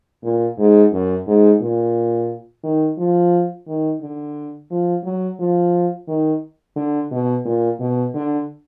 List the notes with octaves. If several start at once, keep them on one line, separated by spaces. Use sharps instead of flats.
A#2
G#2
F#2
G#2
A#2
D#3
F3
D#3
D3
F3
F#3
F3
D#3
D3
B2
A#2
B2
D3